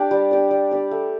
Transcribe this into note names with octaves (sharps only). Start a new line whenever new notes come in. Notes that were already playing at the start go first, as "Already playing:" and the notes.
Already playing: D4 G4 D5
G3
D4 G4 D5
G3
D4 G4 D5
A3